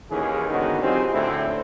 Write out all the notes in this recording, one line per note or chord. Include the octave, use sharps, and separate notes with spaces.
D#2 D#3 E3 C#4 G#4
G#2 D3 D#3 B3 C#4 F#4
F#3 C4 D#4 F4 G4 G#4
D2 A2 D3 C4 E4